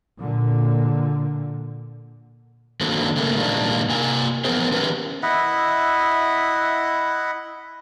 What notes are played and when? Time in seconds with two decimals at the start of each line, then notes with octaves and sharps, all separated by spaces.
0.18 A#2 D3
2.81 D#3 F#3 A#3 C4 D4 A4
3.16 C#3 A3 A#3
3.36 A#2 D#3 G#3 A#3 D4
3.89 C3 A#3 G#5
4.45 E3 F3 B3 G#4 A#4 C5
4.72 D3 E3 C#4 G4 A#4 B4
5.23 E4 D#5 E5 F#5